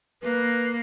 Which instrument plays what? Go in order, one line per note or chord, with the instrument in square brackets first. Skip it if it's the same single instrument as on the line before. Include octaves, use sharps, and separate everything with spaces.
[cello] A#3 [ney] B4